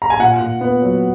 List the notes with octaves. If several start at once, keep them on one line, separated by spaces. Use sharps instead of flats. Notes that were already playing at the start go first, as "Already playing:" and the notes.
A#5
G#5
A#2 F#5
A#2
B3
F#3